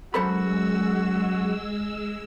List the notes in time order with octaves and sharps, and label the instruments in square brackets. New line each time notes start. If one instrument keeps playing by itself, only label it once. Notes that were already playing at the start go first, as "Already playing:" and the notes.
[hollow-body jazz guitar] F#2 B5 [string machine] G#3 E6 [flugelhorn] F#4 [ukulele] A4 C5 F#5